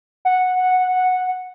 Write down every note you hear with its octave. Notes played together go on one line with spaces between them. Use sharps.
F#5